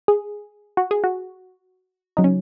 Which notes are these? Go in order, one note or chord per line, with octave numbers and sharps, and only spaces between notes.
G#4
F#4
G#4
F#4
C#3 F#3 D#4
C#4